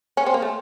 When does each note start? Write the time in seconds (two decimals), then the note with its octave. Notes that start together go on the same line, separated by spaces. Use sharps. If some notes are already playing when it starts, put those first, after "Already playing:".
0.17 C#4
0.26 C4
0.34 A#3
0.42 A3